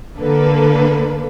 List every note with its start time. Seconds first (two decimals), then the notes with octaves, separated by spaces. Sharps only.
0.18 D3 A#3 A4 B4